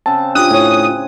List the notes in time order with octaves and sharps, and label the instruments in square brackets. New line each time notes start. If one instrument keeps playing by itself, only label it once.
[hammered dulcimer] C#3 C4 [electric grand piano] A5
[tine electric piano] D4 F4 [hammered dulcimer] G4 G5 [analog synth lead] D#6 [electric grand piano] F#6
[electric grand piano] A2 C#5 [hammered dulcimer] G#5